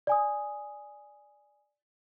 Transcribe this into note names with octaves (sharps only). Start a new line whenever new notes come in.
D5 G#5 D#6